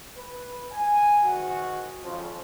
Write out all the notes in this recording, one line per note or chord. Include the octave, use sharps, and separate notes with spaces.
B4
G#5
G#2 D#3 F#4
F2 C#3 F3